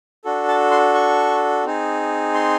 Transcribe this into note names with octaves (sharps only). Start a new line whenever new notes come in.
D4 F#4 A4
A5
C6
C#6
C4 D#4 G#4
C6